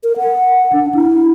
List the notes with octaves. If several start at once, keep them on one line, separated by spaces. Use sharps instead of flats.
A#4
F#5
D4
E4